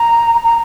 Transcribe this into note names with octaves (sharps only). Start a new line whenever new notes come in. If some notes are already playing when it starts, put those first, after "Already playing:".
Already playing: A#5
A#5